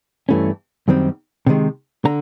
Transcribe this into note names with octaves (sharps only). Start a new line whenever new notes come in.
G2 E3 A3 C#4
F#2 D#3 G3 C4
C3 D#3 G#3
D3 A#5